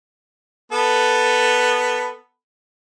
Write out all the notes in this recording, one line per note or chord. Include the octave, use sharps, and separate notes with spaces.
B3 A4 B5